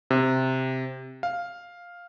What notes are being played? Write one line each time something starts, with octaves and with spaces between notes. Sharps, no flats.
C3
F5